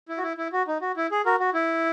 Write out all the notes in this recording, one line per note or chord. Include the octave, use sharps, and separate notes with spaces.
E4
F#4
E4
E4
F#4
D#4
F#4
E4
G#4
F#4 A#4
F#4
E4